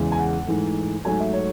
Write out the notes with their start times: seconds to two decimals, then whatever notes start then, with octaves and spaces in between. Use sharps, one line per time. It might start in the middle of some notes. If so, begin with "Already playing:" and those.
Already playing: E2 C#3 G#3
0.12 G#5
0.18 F#5
0.46 G#2 E3 A3
1.05 G#2 F#3 A3 G#5
1.20 E5
1.33 C#5